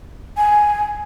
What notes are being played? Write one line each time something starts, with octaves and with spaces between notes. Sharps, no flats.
G#5